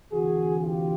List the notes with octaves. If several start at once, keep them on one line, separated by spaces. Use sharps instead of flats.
D2 C3 E3 F#4 G#4
F4 G4